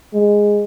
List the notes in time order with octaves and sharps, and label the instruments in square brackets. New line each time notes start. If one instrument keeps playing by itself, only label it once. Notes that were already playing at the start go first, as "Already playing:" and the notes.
[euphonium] G#3